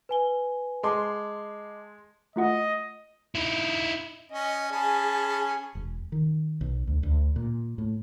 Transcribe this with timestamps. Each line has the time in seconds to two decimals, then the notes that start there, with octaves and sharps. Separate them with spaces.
0.09 B4 G#5 G7
0.83 G#3 D#5 A5 C6 D6
2.36 A3 F4 D#5 F#5
3.35 D#4 E4
4.32 C#4 D#5
4.72 C#4 G#4 A5 B5
5.75 E1
6.12 D#3
6.61 B1
6.87 D2
7.03 D2
7.36 A#2
7.78 A2